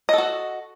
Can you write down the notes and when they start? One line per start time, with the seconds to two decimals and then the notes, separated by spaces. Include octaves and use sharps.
0.09 D#5
0.13 A4
0.18 F#4